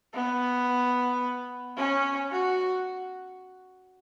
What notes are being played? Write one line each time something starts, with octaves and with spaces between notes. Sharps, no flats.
B3
C#4
F#4